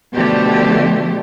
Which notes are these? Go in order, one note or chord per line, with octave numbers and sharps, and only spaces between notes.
B2 D3 F3 A3 G4